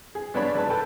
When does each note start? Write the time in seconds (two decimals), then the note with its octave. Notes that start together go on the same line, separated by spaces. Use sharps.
0.15 G#4
0.34 G2 B3 D4 C#5 B5
0.55 G#1 B4 A5
0.70 A4 B4 G5 A5